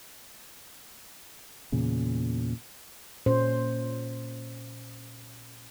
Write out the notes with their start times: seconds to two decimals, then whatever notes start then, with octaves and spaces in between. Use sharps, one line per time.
1.72 E2 A#2 C#3
3.26 A#2 C#4 C5